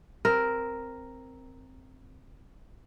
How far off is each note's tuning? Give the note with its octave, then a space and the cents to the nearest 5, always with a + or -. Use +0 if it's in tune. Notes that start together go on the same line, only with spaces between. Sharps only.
C4 +0 A#4 +0